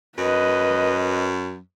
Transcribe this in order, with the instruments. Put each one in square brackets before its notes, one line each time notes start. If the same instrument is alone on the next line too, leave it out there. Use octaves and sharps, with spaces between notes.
[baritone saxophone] F#2 [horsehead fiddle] B4 D#5